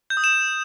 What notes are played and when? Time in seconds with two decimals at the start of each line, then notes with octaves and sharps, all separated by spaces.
0.10 G6
0.17 D#6
0.24 E7